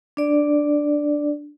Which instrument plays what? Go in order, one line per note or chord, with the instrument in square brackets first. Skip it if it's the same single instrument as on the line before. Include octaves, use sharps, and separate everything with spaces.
[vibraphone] D4 D5